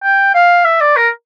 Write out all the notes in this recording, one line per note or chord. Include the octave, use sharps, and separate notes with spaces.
G5
F5
E5
D5
A#4